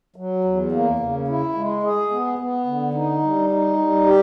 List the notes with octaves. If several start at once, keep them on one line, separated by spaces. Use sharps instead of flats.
F#3
E2
A#3
C#3
E4
G#3
G#4
B3
B3
D3
D#4
G3
D#4
G3
G4